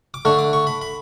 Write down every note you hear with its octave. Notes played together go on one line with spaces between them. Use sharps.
D6
D3 A3 D4 C#6
D6
C#6
B5
B5